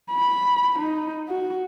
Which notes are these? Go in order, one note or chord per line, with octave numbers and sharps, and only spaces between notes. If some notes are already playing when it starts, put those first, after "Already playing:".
B5
D#4
F#4